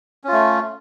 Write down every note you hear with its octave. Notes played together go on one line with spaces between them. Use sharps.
A3 C#4 F4